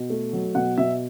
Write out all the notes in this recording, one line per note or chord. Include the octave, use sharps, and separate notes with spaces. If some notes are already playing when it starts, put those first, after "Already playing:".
Already playing: B2
A3
F#3
B2 F#5
B2 E5